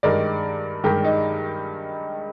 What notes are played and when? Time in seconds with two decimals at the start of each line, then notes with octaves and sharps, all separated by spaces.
0.03 G2 D#3 G#3 A#4 D5
0.84 G2 D#3 G#3 G4 A#4
1.04 D#4